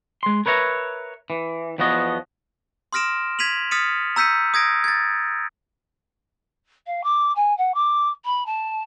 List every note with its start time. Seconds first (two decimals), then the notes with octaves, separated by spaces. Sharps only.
0.23 G#3 C6
0.46 A#4 B4 C#5 E5 A#5
1.30 E3
1.78 E2 F3 B3 F#4 D#5
2.93 C6 D#6 F6 A#6 D7 E7
3.39 G#6 B6 D#7 F7 F#7
3.71 D#6 F6 A6 B6 C#7 D#7
4.16 A#5 E6 G6 B6 C#7 D#7
4.54 D#6 G#6 A#6 D7
4.84 G#6 A6
6.86 F5
7.03 D6
7.35 G#5
7.57 F#5
7.74 D6
8.25 B5
8.46 A5